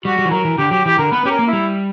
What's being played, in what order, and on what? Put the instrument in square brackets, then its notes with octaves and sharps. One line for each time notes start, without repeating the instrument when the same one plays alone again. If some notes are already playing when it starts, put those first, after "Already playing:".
[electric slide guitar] G3 [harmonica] F#4
[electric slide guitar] G3
E3
[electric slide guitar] F#3 [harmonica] A#4
[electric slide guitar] E3
[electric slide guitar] D3 [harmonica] G4
[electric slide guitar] F#3 [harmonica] G4
[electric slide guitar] E3 [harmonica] G4
[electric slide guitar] D3 [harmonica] A#4
[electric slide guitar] B3 [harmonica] B4
[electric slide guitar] C#4 [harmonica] G4
[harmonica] A#4
[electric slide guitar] A#3
[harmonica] E4
[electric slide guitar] G3